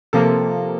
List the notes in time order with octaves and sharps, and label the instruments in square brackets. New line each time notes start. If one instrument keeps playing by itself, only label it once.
[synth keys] C3 F3 A#3 [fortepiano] A4